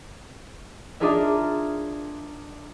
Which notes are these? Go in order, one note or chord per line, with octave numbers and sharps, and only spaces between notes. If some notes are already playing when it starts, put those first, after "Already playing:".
D4 D#4 F4 G#4 A#4 E5